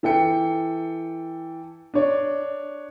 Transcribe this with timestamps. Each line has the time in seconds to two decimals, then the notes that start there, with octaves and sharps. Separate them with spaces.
0.03 E3 A4 G5 C#7
1.94 D4 C#5 D5